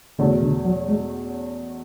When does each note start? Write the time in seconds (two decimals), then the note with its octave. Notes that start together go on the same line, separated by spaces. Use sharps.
0.19 E2 B2 D3 A3 C#4 F#4
0.42 D3
0.65 F#3
0.88 G#3